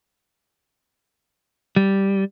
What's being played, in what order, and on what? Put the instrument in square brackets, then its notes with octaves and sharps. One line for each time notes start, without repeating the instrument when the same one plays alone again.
[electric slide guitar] G3